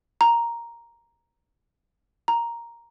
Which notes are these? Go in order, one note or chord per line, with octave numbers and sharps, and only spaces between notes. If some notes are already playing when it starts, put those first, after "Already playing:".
A#5
A#5